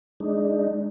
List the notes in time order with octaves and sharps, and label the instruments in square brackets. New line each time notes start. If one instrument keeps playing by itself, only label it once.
[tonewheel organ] G#3 D4 D#4